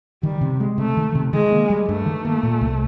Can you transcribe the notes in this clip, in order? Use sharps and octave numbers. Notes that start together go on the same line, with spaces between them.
D#3 G3
C3
G#3
C3 A3
D#3
C3
D#3 G#3
A#3
G3
G2 A3
D#3
A#3
A#2
C2